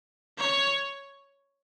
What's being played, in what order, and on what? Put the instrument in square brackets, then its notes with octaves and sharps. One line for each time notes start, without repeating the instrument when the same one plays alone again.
[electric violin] C#5